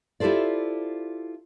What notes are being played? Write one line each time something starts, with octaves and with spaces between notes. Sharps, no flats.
E4 F4 G4 A4 C5 D5